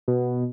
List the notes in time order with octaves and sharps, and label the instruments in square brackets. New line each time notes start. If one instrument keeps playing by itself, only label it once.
[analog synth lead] B2